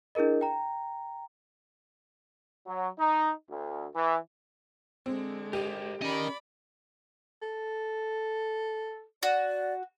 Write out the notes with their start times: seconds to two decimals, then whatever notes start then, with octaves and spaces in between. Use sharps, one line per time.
0.15 D4 E4 G#4 A#4 D#5
0.41 G5 A#5
2.67 F#3
2.99 D#4
3.50 D2
3.95 E3
5.06 D3 G#3 C4
5.53 G4 A#4 C5 D#5
6.02 C#4 A#4 D5 D#5 B5
7.42 A4
9.23 F#4 D5